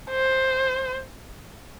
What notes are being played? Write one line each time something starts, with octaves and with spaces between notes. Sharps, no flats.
C5